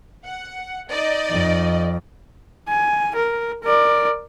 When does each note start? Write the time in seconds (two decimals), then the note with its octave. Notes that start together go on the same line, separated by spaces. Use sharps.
0.25 F#5
0.91 D#4 D5 D#5
1.31 F2
2.68 G#5
3.15 A#4
3.63 A#4 D5